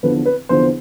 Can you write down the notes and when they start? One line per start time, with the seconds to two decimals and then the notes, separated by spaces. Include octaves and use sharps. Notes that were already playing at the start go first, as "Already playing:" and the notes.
0.03 E2 D3 F3 B4
0.25 B4
0.49 E2 D3 F3 C5